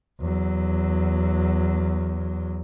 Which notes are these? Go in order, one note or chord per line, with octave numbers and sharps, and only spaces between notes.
E2 F#3